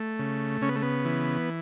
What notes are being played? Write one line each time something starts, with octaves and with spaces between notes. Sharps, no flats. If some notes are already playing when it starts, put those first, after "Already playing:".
Already playing: A3
C#3
C#3 C#4
B3
A3
B3
E3